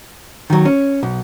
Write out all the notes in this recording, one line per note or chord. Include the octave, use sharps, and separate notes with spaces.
D#3 F#3
C#4
B1